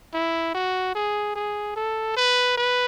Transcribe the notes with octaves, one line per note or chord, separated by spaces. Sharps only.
E4
F#4
G#4
G#4
A4
B4
B4